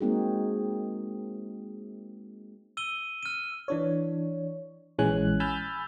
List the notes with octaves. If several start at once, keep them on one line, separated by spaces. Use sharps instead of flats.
G#3 A#3 C4 D#4 F#4 G#4
E6 D#7 G7
F6 D#7
E3 D4 C#5
A#1 E3 G#3 C#4 G#5 F#6
G#5 B5 E6 F6 G6 A6